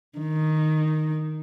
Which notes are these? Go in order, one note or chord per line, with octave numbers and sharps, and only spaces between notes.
D#3